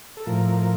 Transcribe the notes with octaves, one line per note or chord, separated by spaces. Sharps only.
A4
A2 F3 A#4